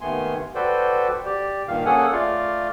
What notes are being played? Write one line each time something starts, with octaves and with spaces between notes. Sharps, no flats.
D#2 D#3 A3 B3 G#5 C6
F#4 A4 B4 C5 D5 G5
G4 D5
G2 A#2 D#3 F5
A#3 C#4 G#4 A4 F#5 G#5
A3 F4 D5 F5